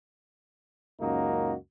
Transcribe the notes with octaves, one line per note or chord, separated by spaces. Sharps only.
C#2 F#2 A#3 D#4 F#4